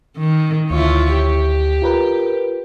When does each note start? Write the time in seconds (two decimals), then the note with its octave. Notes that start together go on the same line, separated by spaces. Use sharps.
0.18 D#3
0.70 D2 E4 F4 C#5
1.14 G4
1.82 F4 A#4 B4